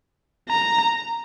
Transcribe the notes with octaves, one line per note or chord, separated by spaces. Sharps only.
A#5